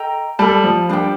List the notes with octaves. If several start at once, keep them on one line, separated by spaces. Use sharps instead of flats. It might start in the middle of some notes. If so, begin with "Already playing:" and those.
Already playing: A4 D#5 G5 A#5
G3 A4 D5 A5
F3
G3 D4 G4 C5 G5